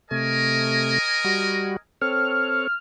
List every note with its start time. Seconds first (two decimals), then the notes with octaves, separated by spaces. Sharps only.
0.11 C3 A3 A#4 D#5 G#5
1.24 G3 F#4
2.02 C4 A4 C#5 F6